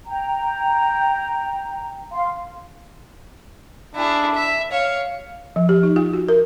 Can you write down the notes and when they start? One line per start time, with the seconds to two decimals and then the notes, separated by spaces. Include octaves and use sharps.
0.06 G5 A#5
2.11 F5 C6
3.95 D4 E4 G#4
4.35 E5
4.72 C#5 F5
5.56 F3
5.69 G4
5.83 D#4
5.96 F4
6.13 F#4
6.29 A#4